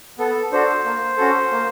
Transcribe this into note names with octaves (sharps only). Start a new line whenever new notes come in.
B3 A4
D4 F#4 A4 C5
A#3
C#4 F#4 A4
A#3